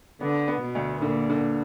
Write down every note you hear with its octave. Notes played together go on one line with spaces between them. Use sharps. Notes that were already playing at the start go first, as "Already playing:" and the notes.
D3 B3
B3
B2
D2
A#2 D3
D3